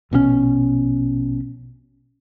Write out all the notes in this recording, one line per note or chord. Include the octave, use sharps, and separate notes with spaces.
A#1 B2 D#3 C#4